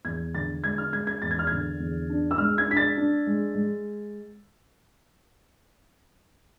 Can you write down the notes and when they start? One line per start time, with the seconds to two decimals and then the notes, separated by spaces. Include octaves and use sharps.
0.05 E2 G#6
0.34 D3 A6
0.64 G#3 G#6
0.78 F6
0.92 G#3 G#6
1.07 G#6
1.22 E2 A6
1.31 G#6
1.39 F6
1.47 D3 G#6
1.80 E2
2.10 D4
2.31 E6
2.38 G#3 F6
2.58 G#6
2.68 D4 B6
2.77 A6
2.97 D4
3.26 G#3
3.55 G#3